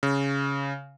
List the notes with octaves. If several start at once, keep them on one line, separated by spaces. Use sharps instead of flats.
C#3